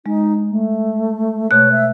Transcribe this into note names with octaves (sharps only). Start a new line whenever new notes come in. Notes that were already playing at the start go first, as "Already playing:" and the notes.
G#3 D#4
A3
B2 A3 C#5 F#6
E5